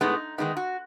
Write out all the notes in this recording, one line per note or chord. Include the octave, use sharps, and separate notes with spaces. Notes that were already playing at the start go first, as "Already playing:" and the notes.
A2 G#3 B3 D#4
D#3 G#3 B3 D#4
F#4